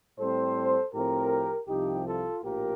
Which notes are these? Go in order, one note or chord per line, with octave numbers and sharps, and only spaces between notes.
A2 G3 C4 A4 C5
A2 F3 C4 G4 A#4
C2 C3 F3 D#4 G4
F4 A4
A#1 A2 F3 A#3 G4 A#4